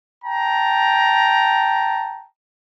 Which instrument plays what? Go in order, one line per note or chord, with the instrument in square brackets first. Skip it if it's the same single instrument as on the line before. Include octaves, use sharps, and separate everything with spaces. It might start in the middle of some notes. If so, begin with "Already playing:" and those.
[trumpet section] G5 A5 A#5